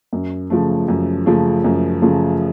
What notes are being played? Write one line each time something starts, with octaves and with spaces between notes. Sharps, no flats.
F#2
C#3 F3 A3
F#2
C#3 F3 A3
F#2
C#3 F3 A3